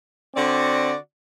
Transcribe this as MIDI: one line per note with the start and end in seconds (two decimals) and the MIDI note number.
0.35 0.95 50
0.35 0.95 60
0.35 0.95 66
0.35 0.95 74